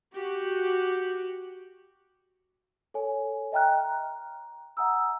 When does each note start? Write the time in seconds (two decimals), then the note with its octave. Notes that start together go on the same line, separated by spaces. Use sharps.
0.14 F#4 G4
2.94 A4 C#5 G#5
3.52 D#5 E5 G5 A#5 F6 F#6
3.84 A#5
4.77 E5 F#5 G#5 A#5 D#6 E6